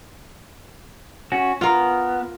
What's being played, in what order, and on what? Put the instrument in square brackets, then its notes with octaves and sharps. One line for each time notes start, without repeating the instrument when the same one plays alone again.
[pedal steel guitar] C#4 F#4
[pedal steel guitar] B3 [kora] F4 A#4